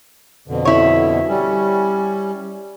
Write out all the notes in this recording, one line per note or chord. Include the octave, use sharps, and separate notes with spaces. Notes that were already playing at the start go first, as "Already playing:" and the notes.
F2 B2 D3
E4 C#5
G3 C#4